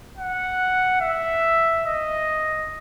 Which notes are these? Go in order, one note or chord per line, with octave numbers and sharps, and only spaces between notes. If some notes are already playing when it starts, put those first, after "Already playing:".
F#5
E5
D#5